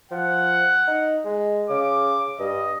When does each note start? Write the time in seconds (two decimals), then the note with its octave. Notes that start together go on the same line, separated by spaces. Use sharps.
0.11 F3 F#5
0.88 D#4
1.25 G#3
1.70 C#3 D6
2.39 G2 D#5